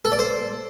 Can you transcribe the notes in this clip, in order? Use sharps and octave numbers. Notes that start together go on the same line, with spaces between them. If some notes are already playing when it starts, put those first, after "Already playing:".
A4
D5
C5